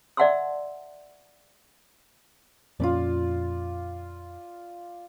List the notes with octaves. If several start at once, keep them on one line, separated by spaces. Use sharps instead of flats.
D5 E5 F#5 A5 C6 E6
F2 A#2 C#4 F4 D5